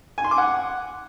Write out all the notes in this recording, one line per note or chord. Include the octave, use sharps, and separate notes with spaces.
G#5
C6
D6
F#5